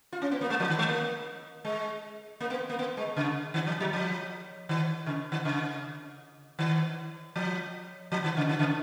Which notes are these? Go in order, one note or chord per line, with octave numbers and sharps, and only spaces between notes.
F4
C#4
B3
A#3
G#3
F3
D#3
G#3
A#3
G#3
A#3
B3
A#3
B3
G#3
C#3
D#3
F3
F#3
F3
D#3
C#3
D#3
C#3
D#3
F3
F3
D#3
C#3
D#3
C#3